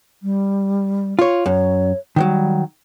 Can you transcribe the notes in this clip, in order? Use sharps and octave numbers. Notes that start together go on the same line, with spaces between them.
G3
F4 C#5
F#2 C#5
D#3 E3 F#3 G3